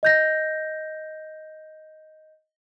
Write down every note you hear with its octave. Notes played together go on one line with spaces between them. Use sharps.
D#5 G6 A#6